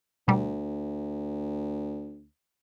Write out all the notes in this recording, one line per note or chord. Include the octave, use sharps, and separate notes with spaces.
D2 B2 G3